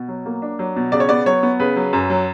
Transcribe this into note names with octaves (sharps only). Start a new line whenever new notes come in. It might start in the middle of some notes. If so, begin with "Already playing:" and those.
Already playing: B2
F#3
A#3
D4
F#3
B2
C#3 D5
C#5
B3 D5
F#3 C#5
B3
C#3 B4
F#3
F#2
F#3